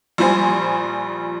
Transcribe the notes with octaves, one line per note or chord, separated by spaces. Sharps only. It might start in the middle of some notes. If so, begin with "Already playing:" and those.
A#1 F3 G3 C5 G#5